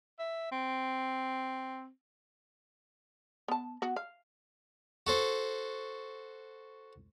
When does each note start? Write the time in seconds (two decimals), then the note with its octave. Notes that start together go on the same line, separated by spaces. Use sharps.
0.19 E5
0.52 C4
3.48 B3 A5
3.82 B3 F#4
3.96 F5
5.07 F#4 A4 C5